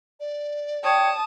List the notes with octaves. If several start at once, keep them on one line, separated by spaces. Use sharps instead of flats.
D5
C#5 G5 A5 D#6